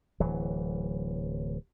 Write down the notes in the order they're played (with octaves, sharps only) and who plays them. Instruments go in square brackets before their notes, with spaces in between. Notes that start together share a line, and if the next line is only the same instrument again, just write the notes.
[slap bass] D1 E3 F#3